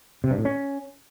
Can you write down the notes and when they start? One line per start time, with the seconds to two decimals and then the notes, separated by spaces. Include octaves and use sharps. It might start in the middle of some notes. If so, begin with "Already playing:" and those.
0.24 C3
0.31 G2
0.38 A2
0.45 C#4